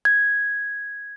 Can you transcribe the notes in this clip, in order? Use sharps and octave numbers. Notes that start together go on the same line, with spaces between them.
G#6